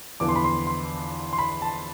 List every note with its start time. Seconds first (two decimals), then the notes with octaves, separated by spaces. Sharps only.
0.20 E2 D3 F3 B3 E4 D6
0.29 C6
0.36 B5
0.44 C6
0.67 C6
1.33 C6
1.38 B5
1.62 A5